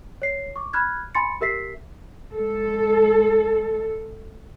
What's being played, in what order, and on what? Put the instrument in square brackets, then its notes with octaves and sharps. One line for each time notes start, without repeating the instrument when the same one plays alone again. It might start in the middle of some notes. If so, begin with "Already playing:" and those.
[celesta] C#5 C7
C#6 D6
B5 F6 F#6 G#6
G#5 B5 C6 A6 C#7
G4 A#4 E5 B6 C7
[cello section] G#3 A4